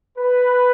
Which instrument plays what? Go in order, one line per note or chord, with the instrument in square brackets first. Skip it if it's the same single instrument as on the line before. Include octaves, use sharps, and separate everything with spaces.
[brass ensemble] B4